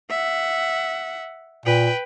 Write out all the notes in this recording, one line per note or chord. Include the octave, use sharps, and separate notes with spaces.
E5 F#5
A#2 B4 G5